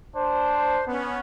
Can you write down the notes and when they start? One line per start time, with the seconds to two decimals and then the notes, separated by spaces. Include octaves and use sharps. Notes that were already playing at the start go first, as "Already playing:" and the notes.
0.16 D4 C5
0.87 B3 C#4